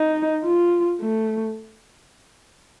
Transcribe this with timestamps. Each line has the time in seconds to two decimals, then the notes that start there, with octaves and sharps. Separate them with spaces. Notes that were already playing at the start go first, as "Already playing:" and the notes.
Already playing: D#4
0.44 F4
1.00 A3